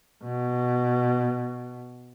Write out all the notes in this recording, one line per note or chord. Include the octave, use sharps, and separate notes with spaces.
B2